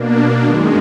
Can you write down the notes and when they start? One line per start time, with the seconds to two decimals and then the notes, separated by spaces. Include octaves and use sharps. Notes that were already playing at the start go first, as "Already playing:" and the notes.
Already playing: B2 A#3 D4
0.44 F#2 D#3 G#3